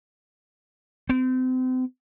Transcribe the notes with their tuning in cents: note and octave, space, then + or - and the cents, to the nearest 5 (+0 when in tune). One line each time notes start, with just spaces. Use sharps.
C4 -35